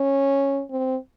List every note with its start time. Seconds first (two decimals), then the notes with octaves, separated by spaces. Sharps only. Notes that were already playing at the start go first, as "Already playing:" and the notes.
Already playing: C#4
0.71 C4